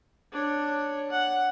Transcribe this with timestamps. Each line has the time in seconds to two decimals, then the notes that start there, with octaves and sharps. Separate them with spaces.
0.32 D4 C#5
1.11 F#5